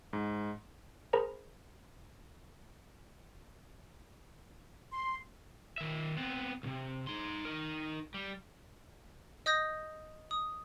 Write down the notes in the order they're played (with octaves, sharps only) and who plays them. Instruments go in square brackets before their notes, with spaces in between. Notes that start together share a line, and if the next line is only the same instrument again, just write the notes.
[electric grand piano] G#2
[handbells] G#4 A#4 C5 A#5 B5
[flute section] C6
[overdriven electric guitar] D#3 E5
B3 C4
C2 C3
D#4 C6
D#4 A#4
G3
[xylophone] D#5 D#6 G6 A#6
D#6